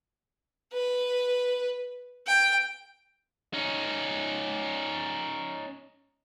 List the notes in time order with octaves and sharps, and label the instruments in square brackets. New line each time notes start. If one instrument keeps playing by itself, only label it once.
[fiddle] B4
G5
[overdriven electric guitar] C#4 D#4